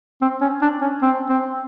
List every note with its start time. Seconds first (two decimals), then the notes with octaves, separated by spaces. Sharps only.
0.21 C4
0.41 C#4
0.62 D4
0.82 C#4
1.02 C4
1.29 C4